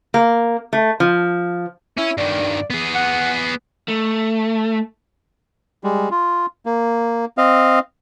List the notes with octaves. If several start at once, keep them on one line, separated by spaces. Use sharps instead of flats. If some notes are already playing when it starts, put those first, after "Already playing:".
A#3
A3
F3
C#4 E4
G2 D#3 D5
B3 G#4
F#5
A3
G3 G#3
F4
A#3
C4 D#5 F5